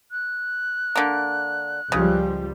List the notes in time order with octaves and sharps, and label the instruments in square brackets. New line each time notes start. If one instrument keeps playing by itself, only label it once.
[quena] F#6
[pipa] D3 A#3
[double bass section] C#2 F3 G3 [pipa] C#3